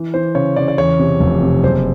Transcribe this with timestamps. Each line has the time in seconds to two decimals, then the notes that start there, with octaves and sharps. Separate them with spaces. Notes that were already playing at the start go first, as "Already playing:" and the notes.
Already playing: E3
0.14 E3 C5
0.35 C#3 C#5
0.56 C#3 D5
0.68 D5
0.78 E2 C#5
0.99 C3
1.20 F1
1.42 C3
1.63 F#1 C5